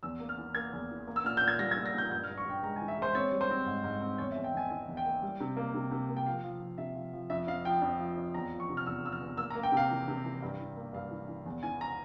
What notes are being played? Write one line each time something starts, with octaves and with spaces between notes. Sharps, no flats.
E2 E6
A#3
F6
E3
A#3 G#6
E2
E3
A#3
E6
A#2 F6
A#2 G6
G#6
G3 A#6
G#6
A#2
A#6
A#2 G6
G2 G6
F6
G2
C#6
G2 G5
G#3 A#5
G#5
E3
E5
G#3 C5
C4 C#5
G3
C5
C4
G#2
G#2
C4
E2 C#5
E5
E2
G5
E2 G#5
E3 G#5
E2
G5
A#3
G3
C3
A#3
C3
C3
A#3
G5
F3 F5
F3
F3
C3 E5
F3
F3
F2 E5
F2 F5
F3 G5
F2
F3
F2
E2 A#5
F3
C#6
C3
F6
E2 E6
F3 E6
F6
E2
A#3 E6
A#5
A#3
G5
C3 F5
E3
C3
E3
G2
E3
A#3
G2 F5
E3
E3
E2
E3 G#5
A#5